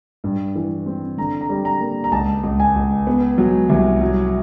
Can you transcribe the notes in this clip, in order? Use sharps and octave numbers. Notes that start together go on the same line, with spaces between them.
G2
E3
C4
D3 A#5
A#5
G3
A#5
A#3
A#5
C#2 A5
C#2
G#5
C#2
B3
F#3
C2
F#3